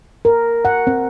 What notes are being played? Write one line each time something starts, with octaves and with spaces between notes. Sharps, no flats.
A#4
F#5
C4